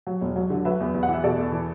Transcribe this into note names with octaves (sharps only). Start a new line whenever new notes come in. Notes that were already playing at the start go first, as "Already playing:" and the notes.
F#3
E1
F#3
D3
F#3 B4 E5
E2
E2
F#5
E3 E5
B2 A4 D5
E2
E3